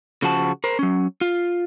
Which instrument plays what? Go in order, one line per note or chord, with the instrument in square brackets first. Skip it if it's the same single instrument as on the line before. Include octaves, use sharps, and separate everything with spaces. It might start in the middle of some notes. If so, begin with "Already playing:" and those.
[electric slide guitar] C#3 F3 F#4 A5
A#4 C5
F#3 C#4
F4